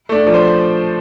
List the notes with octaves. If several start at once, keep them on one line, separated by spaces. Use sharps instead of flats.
A3 D4
F3 D5
C5